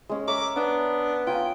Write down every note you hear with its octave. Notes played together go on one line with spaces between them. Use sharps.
G#3 C#4
A#4 C#5 E5 D6
B3 D4
F4 G5 G#5 A#5